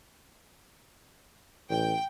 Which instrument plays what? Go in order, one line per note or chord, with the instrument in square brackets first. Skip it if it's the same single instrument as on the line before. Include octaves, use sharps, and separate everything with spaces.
[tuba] A1 [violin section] G5